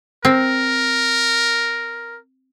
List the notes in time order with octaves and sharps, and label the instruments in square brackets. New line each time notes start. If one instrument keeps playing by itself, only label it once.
[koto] C4 [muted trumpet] A#4